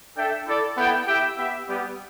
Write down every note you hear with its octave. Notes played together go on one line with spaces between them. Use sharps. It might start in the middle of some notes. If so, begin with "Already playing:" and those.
D4 A4 E5 G5
E4 A4 D5
B3 E4 A4 G5
E4 G4 E5 G5
B3 G4 E5
G3 B3 G4